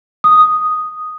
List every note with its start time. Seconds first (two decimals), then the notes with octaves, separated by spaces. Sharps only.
0.24 D#6